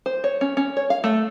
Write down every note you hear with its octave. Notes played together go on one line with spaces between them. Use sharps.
C5
C#5
C#4
C#4
C#5
F5
A3